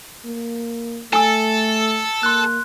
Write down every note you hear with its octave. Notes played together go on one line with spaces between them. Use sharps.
A#3
A3 A4 G#5 E6
A#3 C6 F#6